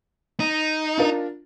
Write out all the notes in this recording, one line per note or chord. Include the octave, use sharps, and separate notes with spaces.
D#4
D4 F4 A#4